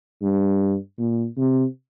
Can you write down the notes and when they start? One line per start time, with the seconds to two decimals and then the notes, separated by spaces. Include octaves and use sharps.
0.22 G2
0.99 A#2
1.37 C3